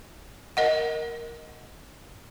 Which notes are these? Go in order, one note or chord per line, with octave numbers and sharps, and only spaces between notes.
A#4 D#5 F#5